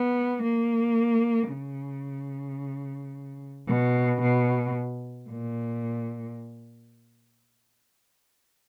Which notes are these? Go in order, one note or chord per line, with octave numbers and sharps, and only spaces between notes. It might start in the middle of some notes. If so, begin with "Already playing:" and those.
Already playing: B3
A#3
C#3
B2
B2
A#2